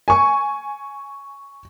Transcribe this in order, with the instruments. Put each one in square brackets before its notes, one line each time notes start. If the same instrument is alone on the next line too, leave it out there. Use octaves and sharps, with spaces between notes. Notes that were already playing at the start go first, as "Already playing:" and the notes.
[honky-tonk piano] G#5 C#6